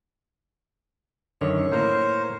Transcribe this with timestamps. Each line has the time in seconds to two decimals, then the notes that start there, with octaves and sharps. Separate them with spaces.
1.41 F#2 D3 D#3 C#5
1.72 A2 A#3 A#4 C5